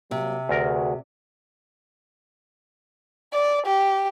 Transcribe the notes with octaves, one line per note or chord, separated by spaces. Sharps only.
C3 F#3 G3 A#3
D2 F#4 G#4 A#4 B4
D5
G4